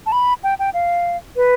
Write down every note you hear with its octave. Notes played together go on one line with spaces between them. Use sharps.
A5
B5
G5
G5
F5
B4